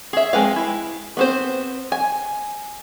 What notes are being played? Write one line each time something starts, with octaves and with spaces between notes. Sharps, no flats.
G#4 E5
G#3 C4 B4 F5
E4
B3 C4 C5
G#5